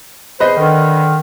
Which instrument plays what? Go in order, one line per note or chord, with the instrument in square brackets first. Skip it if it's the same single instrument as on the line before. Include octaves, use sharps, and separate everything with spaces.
[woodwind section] E2 C5 [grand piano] B4 D#5
[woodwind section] D3 D#3